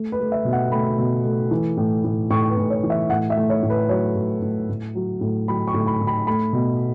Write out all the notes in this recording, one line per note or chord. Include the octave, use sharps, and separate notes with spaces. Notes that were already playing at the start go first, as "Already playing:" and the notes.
Already playing: A3
B4
A3
E5
B2
F#5
A3 B5
B2
A3
E3
A2
A2
A2 C#6
B4
A2
C#5
E3
E5
A2 F#5
E5
A3
C#5
A2
B4
F#3 C#5
A2
A2
A2
F#3
A2
F#3 B5
C#6
A2
B5
A2
B5
A3 B5
B2